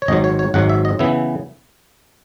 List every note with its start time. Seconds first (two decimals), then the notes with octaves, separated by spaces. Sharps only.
0.02 C#5
0.08 G#1 G#2 F#3 D#5
0.24 C#5
0.39 C#5
0.54 G#1 G#2 F#3 F#5
0.69 E5
0.85 D#5
0.99 C#3 E3 B3 E5